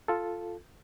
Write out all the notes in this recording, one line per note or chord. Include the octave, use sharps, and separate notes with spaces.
F4 A4